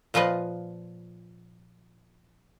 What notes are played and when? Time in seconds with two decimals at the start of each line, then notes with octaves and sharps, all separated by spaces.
0.14 A#2 F3 F4 B4 D#5